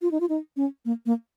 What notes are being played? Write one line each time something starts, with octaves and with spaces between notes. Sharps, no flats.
F4
D#4
F4
D#4
C#4
A#3
A#3